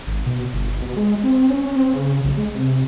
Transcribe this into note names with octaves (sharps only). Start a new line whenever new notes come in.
G#1
B2
G1
B2
G#3
C4
C#4
C4
C#3
B1
G#3
C3